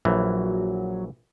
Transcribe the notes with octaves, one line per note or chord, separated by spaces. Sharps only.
A#1 E3 F#3